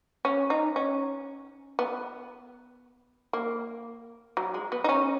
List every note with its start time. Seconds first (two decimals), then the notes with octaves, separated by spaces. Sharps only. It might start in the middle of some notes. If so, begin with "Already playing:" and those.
0.25 C#4
0.50 D#4
0.76 C#4
1.79 B3
3.33 A#3
4.37 F#3
4.54 G#3
4.72 B3
4.84 D#4
4.89 C#4